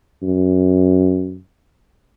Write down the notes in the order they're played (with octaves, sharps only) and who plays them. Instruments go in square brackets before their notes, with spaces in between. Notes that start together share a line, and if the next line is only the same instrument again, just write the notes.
[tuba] F#2